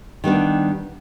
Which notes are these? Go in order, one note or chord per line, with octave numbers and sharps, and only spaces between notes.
D#3 G3 B3 D4